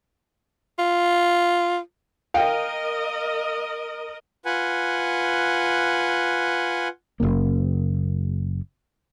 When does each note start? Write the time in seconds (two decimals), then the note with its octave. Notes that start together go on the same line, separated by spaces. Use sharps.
0.79 F4
2.34 A#4 D#5 F5 G5
4.45 F4 B4 F#5 G#5
7.20 F#1 D#2 C#3 A#3